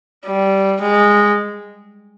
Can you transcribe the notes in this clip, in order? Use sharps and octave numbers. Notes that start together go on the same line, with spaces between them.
G3
G#3